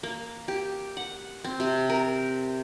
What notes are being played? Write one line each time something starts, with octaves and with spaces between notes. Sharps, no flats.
A#3
G4
F#5
C4
C3
A#4